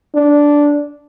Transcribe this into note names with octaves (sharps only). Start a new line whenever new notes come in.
D4